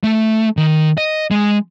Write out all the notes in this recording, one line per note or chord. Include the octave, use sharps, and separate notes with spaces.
A3
D#3
D#5
G#3